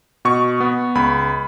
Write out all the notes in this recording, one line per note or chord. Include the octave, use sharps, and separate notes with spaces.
B2 C#6
B3
C#2 B5